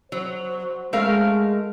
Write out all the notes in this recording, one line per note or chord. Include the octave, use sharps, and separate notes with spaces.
F#3 C5
G#3 A3 A#4 F5